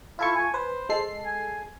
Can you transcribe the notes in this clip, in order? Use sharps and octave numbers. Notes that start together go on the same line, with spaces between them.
E4 F4 A4 C#6
G#5
B4 C5
G#3 A4 C7
G#5